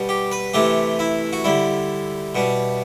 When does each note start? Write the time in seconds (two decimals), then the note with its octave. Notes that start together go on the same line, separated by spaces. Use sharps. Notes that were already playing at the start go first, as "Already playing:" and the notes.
Already playing: B2 G3
0.09 G4
0.32 B4
0.54 C3 E3 A3 G4
0.99 E4
1.33 F#4
1.44 D3 G3 E4
2.35 B2 G3